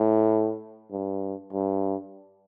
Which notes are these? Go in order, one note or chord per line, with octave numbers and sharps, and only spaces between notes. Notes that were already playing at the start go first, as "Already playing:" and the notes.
Already playing: A2
G2
G2